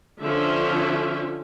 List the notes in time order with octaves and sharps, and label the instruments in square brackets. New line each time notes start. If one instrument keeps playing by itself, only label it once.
[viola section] D3 F3 C#4 E5